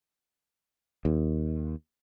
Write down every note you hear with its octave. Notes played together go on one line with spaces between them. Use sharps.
D#2